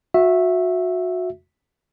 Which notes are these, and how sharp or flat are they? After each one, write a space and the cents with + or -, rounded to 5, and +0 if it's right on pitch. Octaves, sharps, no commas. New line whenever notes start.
F#4 -25 E5 +0